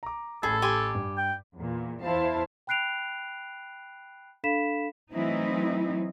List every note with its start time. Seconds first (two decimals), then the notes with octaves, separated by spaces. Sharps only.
0.03 A#5 D6
0.43 A1 G#4 A4 A5 B5
0.62 G4 G#5 C6
0.95 G2
1.17 G5
1.56 E2 A#2
2.01 E2 E4 C5 F5 A5
2.67 G5 B5 F#6 C7 D7 F7
4.44 D4 A4 F5 B5 B6 E7
5.13 E3 F#3 A3 C4 D#4 E4